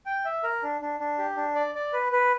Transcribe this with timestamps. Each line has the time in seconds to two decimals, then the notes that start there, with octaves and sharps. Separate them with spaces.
0.06 G5
0.25 E5
0.43 A#4
0.63 D4
0.81 D4
1.00 D4
1.19 G4
1.36 D4
1.55 D5
1.75 D5
1.93 B4
2.12 B4